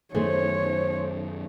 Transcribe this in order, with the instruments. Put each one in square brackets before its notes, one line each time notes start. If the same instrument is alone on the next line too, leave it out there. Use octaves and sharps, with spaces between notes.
[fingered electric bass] F#2 D#3 [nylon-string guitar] A3 G#4 [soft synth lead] C5 [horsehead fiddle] C#5